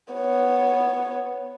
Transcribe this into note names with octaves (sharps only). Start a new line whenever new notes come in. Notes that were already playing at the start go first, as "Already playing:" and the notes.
B3 C#5